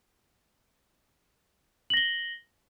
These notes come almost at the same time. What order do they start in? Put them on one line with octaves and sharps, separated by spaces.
F#7 A#6 G7